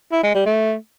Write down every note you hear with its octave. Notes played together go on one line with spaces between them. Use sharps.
E4
G#3
G3
A3